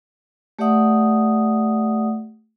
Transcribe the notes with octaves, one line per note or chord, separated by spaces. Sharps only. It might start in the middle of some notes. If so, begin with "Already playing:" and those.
A3 G4 D5 E5 F#5 D#6